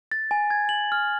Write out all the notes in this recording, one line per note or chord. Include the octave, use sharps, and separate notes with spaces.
A6
G#5
G#6
F#7
F6